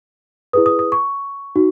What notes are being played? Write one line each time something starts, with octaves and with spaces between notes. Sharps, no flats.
E4 G#4 B4 D#6
D#6
D#6
C#6
D#4 F#4